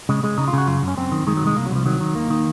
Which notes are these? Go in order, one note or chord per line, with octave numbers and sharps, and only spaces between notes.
C#3 G#3
C#3 G#3
C#3 D#4
F4
C#3 F#4
F#2 F4
F#2
C#4
F#2 C4
D#3
D#3 G#3
F#3
C2
G#3
C2 A#3
F#3
C2 F3
D#3 F#3
D#3
D#2 A#3
D#3